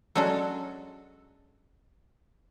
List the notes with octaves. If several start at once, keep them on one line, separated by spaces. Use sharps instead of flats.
F#3 G#3 C#4 D4 F#4 A4